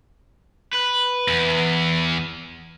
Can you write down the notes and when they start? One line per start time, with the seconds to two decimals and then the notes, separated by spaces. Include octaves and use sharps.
0.73 B4
1.28 E2